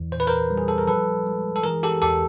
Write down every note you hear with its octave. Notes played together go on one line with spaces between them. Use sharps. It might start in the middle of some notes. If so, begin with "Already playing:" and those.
Already playing: E2 E3
A#2 C5
B4
A#4 C5
G3
G#4
A4
A#4
F3 A4 B4
G#3
A4
E3 G#4 A#4
G4 A4
E2 G4 A4